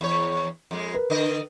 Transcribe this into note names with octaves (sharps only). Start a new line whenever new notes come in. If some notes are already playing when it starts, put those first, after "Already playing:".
E2 C#5
F2 G#3
A#4 B4
D3 D#5